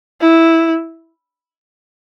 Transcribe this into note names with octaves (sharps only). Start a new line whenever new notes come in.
E4